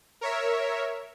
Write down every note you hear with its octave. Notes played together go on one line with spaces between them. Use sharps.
A#4 C#5 E5